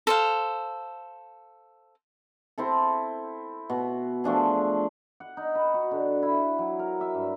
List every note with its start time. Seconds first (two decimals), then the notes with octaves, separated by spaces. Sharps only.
0.07 A4 C5 F5
2.58 C4 E4 A4
3.70 B2
4.24 F3 A3 D4 G#4
5.20 F#5
5.37 D#4
5.55 B4
5.74 F#4
5.91 D3
6.23 E4
6.58 F#3
6.79 A#4
7.01 E5
7.15 G2